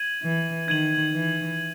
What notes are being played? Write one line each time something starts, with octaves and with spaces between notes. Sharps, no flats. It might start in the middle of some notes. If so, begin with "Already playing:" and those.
Already playing: G#6 D#7 F#7
E3
D#3 G#6 D#7 F#7
E3